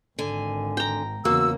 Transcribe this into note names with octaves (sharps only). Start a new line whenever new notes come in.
G#1 D3 G#5
G5 A#5
E2 C#3 A#3 F#4 E6